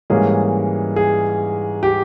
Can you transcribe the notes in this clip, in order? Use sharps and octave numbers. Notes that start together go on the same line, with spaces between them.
G#2 E3 G3 A#3 C#4 G#4
G#4
G4